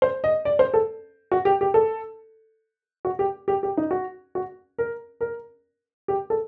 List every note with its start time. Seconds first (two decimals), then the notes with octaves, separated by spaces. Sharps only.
0.02 C5
0.24 D#5
0.45 D5
0.59 C5
0.74 A4
1.32 F#4
1.45 G4
1.61 G4
1.74 A4
3.05 F#4
3.19 G4
3.48 G4
3.63 G4
3.77 D#4
3.91 F#4
4.35 F#4
4.78 A#4
5.21 A#4
6.08 G4
6.30 A4